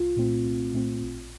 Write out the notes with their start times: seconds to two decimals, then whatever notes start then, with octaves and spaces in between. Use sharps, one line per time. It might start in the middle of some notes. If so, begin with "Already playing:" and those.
Already playing: C2 F4
0.16 A#2 A3 C4
0.45 C2
0.74 A#2 A3 C4
1.01 A1